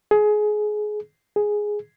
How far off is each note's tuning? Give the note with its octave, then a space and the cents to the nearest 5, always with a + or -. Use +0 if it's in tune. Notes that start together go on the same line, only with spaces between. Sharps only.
G#4 +25
G#4 +5